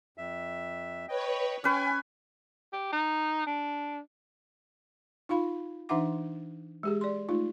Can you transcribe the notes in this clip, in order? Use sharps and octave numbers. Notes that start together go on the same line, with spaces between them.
F2 E5
B4 C#5 D#5 G5
C#4 B4 G5 G#5 C#6 F#6
G4
D#4
D4
D#4 F4 F5 B5
E3 D4 D#4 E5 F#5 D6
G#3 G4 G#4
D5 C6
A3 D#4 F4